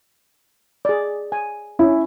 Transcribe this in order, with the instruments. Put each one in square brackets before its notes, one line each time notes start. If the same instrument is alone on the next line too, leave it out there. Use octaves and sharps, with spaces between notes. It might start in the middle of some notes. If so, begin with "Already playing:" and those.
[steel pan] G#4 D5
G#5
[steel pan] C#4 [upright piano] E4